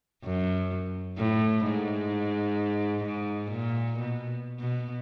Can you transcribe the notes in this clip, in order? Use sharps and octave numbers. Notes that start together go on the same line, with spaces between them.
F#2
A2
G#2
G#2
A#2
B2
B2